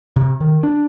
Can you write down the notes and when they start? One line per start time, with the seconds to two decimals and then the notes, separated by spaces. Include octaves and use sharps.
0.16 C3
0.40 D#3
0.63 D4